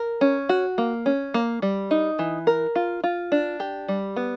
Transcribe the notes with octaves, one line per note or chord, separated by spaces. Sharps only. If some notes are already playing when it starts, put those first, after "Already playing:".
Already playing: A#4
C#4
F#4
A#3
C#4
A#3
G3
D#4
E3
A#4
F4
F4
D4
G4
G3
B3